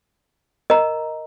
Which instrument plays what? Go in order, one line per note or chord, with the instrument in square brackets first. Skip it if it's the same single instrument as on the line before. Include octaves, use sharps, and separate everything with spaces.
[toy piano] A#4 D#5 A#5